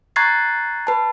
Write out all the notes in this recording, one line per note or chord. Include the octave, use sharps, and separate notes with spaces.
A#5 C#6 F#6 G#6 A6 C7
B4 A5